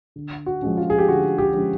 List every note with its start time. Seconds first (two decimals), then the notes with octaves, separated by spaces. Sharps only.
0.16 D3
0.46 F#4
0.62 F3 G#3 C#4
0.77 F4
0.90 G#4
0.99 G4
1.08 D3 F#4
1.38 G4
1.53 F3 G#3 C#4